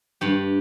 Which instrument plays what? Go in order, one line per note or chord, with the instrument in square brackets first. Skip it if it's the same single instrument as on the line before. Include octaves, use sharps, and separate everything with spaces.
[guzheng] G2 G4